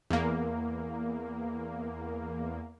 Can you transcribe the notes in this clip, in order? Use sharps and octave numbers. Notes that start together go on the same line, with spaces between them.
E2 A#3